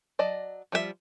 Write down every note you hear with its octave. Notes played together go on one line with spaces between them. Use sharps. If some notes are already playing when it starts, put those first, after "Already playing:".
F#3 D5 D#5 A5
F3 G3 F4 G#4 E5